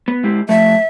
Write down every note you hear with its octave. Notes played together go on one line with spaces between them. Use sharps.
B3
G#3 E4 G4
F3 A3 E5